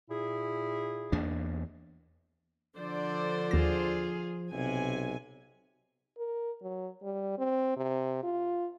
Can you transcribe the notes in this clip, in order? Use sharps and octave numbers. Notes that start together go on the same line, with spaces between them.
A#2 E4 G#4
E2 A#3 D4
D3 F3 C5 D5
D#2 F4 G#4 A#6
B1 C3 G#5
A#4
F#3
G3
C4
C3
F4